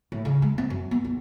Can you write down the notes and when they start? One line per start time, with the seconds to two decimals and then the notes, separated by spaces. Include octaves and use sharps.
0.12 A2
0.25 C#3
0.42 G#3
0.58 C4
0.70 F#2
0.91 B3
1.04 B1